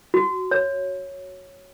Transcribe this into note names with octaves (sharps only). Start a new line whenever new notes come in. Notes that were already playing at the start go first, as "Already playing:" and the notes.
F#4
C#5